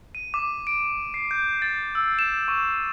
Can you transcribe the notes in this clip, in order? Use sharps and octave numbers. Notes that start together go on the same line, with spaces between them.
D#7
D6
D7
C7
G6
A6
E6
E7
C#6